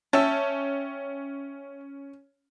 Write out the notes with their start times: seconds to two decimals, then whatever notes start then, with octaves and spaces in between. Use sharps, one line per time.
0.13 C#4 E5 G5 A5